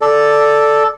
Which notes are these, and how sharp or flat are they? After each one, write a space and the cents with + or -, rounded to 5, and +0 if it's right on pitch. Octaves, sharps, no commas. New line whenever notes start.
A4 +0 D5 +0